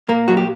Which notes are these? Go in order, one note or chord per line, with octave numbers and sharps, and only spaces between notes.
A#2 A#3 A#4
F#3 F#4
G4